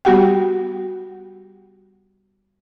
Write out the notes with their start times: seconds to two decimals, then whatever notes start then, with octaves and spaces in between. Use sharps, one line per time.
0.05 G3 B3 F#4 G4 F#5 G5